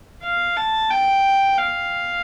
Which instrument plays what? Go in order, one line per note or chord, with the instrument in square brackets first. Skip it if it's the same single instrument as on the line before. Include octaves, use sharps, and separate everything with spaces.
[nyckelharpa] F5
A5
G5
F5